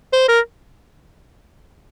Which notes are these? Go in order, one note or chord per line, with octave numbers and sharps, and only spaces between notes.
C5
A#4